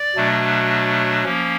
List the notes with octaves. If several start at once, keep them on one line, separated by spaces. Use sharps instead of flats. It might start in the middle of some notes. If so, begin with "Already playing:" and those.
Already playing: D5
B2 F#3 A3 D4
F3 A#3 C#4